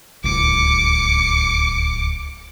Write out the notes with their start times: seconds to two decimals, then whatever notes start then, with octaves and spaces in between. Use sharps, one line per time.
0.24 D1 G#1 C#2 D6 C#7